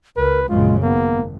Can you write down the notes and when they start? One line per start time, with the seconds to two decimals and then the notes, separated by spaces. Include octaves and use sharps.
0.17 C#2 A#4 B4
0.49 A#1 F#2 C#3 G#3 F4
0.83 G#1 A#3 B3